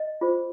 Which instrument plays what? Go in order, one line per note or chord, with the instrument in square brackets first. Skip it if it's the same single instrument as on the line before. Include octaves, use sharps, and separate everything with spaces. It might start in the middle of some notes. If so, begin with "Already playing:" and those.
Already playing: [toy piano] D#5
F4 G#4 C5